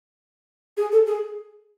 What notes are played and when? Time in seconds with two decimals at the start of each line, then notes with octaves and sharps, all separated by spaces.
0.77 G#4
0.92 A4
1.07 G#4